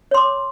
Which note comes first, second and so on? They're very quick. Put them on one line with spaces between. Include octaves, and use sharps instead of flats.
C#5 C6 D6